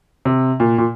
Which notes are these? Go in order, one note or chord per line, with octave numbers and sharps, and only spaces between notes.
C3
A#2
A#2